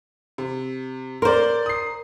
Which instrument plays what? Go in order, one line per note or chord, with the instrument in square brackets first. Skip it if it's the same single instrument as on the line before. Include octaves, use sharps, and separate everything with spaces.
[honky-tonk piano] C3
[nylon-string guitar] A#4 C5 [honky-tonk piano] D5 C6
[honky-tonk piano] D#6 C7